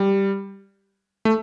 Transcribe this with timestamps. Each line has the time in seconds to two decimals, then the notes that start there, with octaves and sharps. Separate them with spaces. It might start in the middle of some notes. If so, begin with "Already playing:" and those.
Already playing: G3
1.25 A3